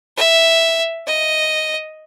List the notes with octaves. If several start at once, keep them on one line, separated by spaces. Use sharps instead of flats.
E5
D#5